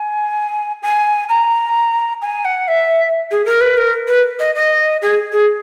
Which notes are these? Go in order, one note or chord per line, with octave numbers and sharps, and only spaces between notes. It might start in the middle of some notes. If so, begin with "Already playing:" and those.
Already playing: G#5
G#5
A#5
G#5
F#5
E5
G#4
A#4
B4
A#4
B4
D#5
D#5
G#4
G#4